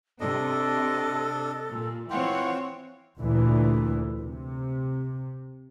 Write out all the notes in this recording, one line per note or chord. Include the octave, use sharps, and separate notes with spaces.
C3 D4 A4 D#5
A#2
E3 C4 F4 C#5 F#5 G5
D2 A#2 E3
C3